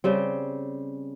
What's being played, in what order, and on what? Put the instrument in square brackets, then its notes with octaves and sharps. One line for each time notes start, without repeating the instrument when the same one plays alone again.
[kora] C#3 G3 C4